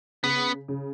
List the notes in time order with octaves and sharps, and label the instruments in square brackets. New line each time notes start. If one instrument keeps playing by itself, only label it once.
[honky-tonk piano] C#3 [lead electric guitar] B3
[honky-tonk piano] C#3